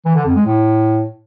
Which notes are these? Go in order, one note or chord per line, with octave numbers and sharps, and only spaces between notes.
E3
D3
F2
G#3
A2